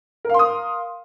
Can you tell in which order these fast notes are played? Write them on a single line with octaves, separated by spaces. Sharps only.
A#4 F5 C6 D#6